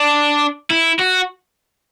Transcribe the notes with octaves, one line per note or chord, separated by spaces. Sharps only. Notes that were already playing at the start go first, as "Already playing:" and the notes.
Already playing: D4
E4
F#4